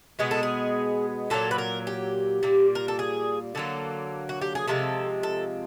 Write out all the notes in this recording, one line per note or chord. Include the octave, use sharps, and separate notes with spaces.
B2 G#3 B3 G#4
A4
G#4
A#2 F#3 A#3 A4
B4
A#4
G4
A#2 G3 A#3
A#4
A4
G#4
D3 F#3 A#3 A4
F#4
G4
G#4
C3 F3 G#3 C4 A4
A4